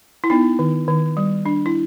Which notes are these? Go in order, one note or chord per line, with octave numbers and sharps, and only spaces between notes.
E4
B3 D#4
D#3
D#3
G3
D4
E4